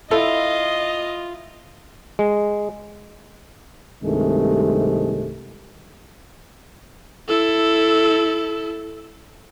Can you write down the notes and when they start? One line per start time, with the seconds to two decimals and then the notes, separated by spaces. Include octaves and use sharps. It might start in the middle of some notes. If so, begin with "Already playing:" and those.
0.11 E4 F4 A4 D#5
2.19 G#3
4.04 C2 G2 C3 D#3 G#3 A3
7.28 E4 A4